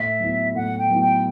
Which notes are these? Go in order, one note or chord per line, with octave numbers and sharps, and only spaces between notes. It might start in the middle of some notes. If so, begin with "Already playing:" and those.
Already playing: A2 E5
F#3 B3 E4
A2 F#5
G5
F#3 B3 E4
G5